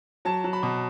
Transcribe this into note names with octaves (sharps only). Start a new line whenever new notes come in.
F#3 A5
F#3
B5
B2